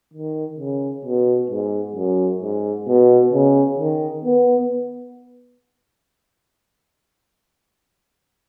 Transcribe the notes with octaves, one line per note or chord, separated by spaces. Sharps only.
D#3
C#3
B2
G#2
F#2
G#2
B2
C#3
D#3
B3